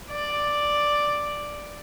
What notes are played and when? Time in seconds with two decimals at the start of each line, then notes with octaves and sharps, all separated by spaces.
0.10 D5